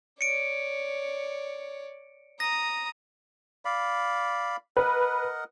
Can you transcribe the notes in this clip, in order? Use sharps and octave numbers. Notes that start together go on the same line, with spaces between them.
C#5 D5 C#7 D7
A#5 D#6 A#6
D5 F5 B5
A#4 B4 D#5 F#5